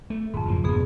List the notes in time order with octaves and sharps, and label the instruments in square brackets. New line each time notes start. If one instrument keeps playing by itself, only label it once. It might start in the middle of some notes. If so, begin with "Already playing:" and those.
[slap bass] A3
[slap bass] D#1 [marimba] F2 G#2
[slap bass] F#1 F3 A#3
[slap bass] F1 G2 [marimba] B2 B3 G#4